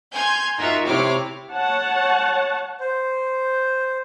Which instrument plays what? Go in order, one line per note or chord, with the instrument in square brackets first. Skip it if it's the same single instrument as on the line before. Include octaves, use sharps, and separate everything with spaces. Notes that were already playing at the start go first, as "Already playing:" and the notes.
[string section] G#5 C6 F6 G6 G#6
D#4 F4 F#4 A#4 E5
C3 C4 E4 C#5 D6 F6
[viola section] C#5 F#5 A5
[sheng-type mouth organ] C5